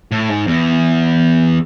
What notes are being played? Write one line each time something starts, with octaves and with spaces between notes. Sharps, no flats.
A2
G#2
E2